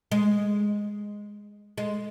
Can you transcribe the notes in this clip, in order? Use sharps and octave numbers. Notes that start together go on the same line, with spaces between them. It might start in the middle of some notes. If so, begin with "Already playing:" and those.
G#3
G#3